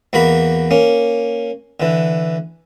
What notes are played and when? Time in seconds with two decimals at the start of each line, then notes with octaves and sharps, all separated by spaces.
0.13 E2 A#3 F#4 A#5 B5
0.71 A#3 C#4
1.80 D3 E3